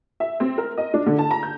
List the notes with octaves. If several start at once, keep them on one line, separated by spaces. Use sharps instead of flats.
E5
C4
A#4
D#5
D4
D3
A5
A#5
G6